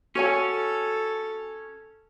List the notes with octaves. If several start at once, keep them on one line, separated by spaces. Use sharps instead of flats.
C#4 F#4 A4 C#5 G#5